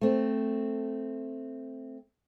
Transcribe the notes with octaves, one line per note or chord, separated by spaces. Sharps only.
A3 C4